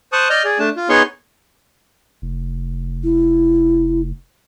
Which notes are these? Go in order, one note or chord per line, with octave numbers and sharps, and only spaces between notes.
C5 A5 C#6 D#6 F#6
D5 D#5 F6 G6
G#4 D5
A3 D4 A5
F4
B3 D#4 G#4 C#5 C6 C#6
F1
E4